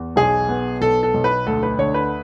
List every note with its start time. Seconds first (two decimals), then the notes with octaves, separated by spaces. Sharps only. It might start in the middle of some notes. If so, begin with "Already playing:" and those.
Already playing: E2
0.16 B1 G#4
0.49 B3
0.81 B1 A4
1.03 A4
1.14 B1
1.24 B4
1.46 D2 A4
1.63 B4
1.79 D3 C#5
1.94 B4